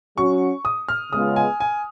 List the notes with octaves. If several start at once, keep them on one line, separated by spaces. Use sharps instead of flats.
F#3 C#4 F#4 C#6
D#6
F6
C#3 G#3 B3 F4 D#6
G#5
G#5